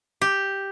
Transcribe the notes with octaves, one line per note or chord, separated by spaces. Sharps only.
G4